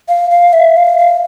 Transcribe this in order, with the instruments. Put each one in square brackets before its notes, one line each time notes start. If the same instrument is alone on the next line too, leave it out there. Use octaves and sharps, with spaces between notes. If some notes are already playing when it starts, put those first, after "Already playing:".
[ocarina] F5
F5
E5
F5
F5